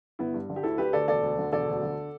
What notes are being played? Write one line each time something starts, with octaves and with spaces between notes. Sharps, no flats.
G1 B3 E4
G2
D3
G4
D2 E4 A4
D3 G4 B4
D2 A4 D5
E1 A4 D5
D2
D3
E1 A4 D5
D2
D3